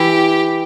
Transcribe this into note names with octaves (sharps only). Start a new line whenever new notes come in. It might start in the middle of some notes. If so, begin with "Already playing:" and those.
Already playing: E3 E4 G4